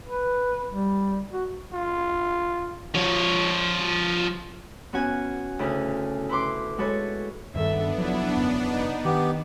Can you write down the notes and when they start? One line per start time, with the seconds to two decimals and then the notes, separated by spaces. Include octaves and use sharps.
0.06 B4
0.70 G3
1.33 F#4
1.73 F4
2.95 F3 C#5
4.93 B3 C#4 F#4 F#5 G#5
5.59 D2 C#3 E4 G#5
6.29 E4 B4 C6 D6
6.78 G#3 F#4 A4 B4 C#5
7.54 D#1 G2 D#3 B3 D4 A4 E5
7.98 F1 F3 F#3 E4
8.37 E1 F#2 C#3
8.70 D#4
9.05 D#3 B3 G4